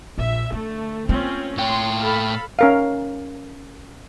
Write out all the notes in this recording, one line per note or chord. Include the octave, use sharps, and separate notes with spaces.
A#1 E5
D3 A3
A3 A#3 C4 C#4 F4
A2 C#5 G5 C6
A4 F5 B5
C#4 A#4 F5